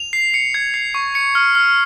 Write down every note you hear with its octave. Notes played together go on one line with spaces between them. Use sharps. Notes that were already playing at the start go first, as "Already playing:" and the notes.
Already playing: F7
C7
C#7
G#6
C7
C#6
C#7
F6
F6